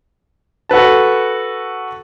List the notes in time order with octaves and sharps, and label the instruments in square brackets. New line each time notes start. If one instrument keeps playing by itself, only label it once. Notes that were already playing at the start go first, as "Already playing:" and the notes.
[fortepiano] F#4 A4 B4 A5